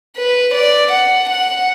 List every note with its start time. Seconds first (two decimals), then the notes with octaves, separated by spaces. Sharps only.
0.17 B4
0.54 D5
0.92 F#5
1.30 F#5